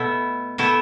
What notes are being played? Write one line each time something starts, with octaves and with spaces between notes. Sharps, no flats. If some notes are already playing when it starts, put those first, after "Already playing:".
Already playing: B2 A3 E4
B2 A3 E4